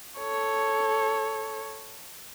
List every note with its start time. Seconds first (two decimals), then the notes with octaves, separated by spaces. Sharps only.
0.19 A4 C#5